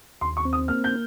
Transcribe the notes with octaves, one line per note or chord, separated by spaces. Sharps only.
D#2 C6
C#6
C4
D#6
A#3 F6
G6